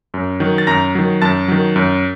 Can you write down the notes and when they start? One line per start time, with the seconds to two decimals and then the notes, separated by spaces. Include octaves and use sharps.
0.14 F#2
0.40 D#3 F#3
0.58 A6
0.67 F#2 A#5 A#6
0.95 D#3 F#3
1.22 F#2 A5 A6
1.48 D#3 F#3
1.76 F#2